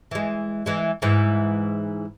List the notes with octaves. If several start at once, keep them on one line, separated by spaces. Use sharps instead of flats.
E3 G#3
E3 G#3
G#2 E3